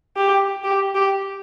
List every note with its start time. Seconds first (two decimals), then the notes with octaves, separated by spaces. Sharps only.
0.17 G4
0.64 G4
0.95 G4